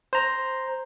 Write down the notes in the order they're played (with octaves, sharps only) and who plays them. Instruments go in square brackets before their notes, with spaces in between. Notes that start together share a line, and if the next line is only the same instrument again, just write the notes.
[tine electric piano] C5 A#5